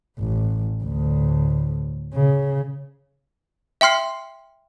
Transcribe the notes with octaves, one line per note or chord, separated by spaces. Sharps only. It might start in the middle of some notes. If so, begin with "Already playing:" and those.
A1
D2 A2
C#3
E5 G5 C6 F6 C7